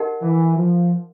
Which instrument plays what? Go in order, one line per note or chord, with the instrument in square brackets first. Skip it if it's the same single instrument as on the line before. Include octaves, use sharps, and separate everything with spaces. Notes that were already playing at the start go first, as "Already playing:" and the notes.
Already playing: [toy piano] D#4 G4 A#4 D#5 F#5
[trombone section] E3
F3